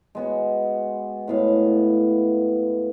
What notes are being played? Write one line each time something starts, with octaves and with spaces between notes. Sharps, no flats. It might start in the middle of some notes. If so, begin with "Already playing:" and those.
G#3 B3 F#4
A2 B3 F5